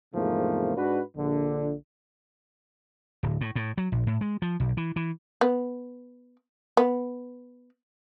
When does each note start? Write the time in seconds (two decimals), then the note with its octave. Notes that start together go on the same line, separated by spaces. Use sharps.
0.14 E2 G#2 C3 F3 A3 A#3
0.76 G#2 D4 F#4 B4
1.17 A#1 D3
3.23 D1
3.41 A2
3.56 A2
3.78 F#3
3.92 A#1
4.07 A2
4.21 G#3
4.42 F3
4.60 B1
4.77 E3
4.96 E3
5.41 B3
6.77 B3